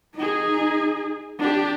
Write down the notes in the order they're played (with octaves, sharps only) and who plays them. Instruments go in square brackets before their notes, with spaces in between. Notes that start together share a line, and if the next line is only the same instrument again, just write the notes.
[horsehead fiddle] D#4 G#4
D4 G4